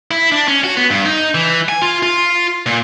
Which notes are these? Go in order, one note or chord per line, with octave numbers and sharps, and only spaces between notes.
E4
D4
C#4
F#4
B3
G2
D#4
E3
G#5
F4
F4
A#2